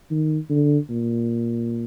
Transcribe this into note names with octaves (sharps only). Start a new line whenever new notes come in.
D#3
D3
A#2